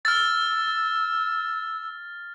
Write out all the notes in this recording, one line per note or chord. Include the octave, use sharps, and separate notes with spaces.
E6 F6 A6